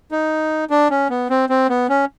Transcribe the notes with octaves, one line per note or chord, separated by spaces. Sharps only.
D#4
D4
C#4
B3
C4
C4
B3
C#4